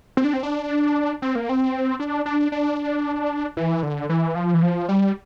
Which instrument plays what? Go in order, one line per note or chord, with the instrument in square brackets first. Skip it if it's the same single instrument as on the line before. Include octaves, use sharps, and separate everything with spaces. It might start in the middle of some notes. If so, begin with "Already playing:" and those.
[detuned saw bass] C4
D4
C4
D4
C4
A#3
C4
D4
D4
D4
E3
D3
E3
F3
E3
F3
G3